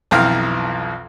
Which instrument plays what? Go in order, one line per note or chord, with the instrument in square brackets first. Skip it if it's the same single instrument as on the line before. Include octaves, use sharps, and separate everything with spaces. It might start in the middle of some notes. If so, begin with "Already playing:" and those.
[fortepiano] B1 F2 E3 F5 G5 A#5